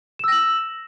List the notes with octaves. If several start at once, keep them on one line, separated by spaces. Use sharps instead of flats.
E6 A#6 E7 F#7